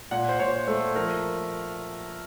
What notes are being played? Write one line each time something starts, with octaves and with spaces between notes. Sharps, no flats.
A#2 F#5
C5
A#2 C#5
A3 C5
F3 A#4